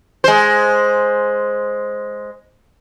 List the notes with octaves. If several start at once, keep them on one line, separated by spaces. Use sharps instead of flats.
G#3 C5